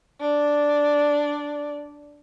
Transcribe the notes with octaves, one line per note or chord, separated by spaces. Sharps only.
D4 D5